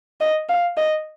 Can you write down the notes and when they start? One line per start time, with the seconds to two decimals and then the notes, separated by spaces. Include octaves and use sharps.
0.21 D#5
0.49 F5
0.77 D#5